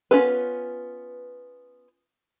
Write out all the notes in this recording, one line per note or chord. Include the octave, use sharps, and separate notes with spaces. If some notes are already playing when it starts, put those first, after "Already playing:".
B3 C#4 F4 A4 B4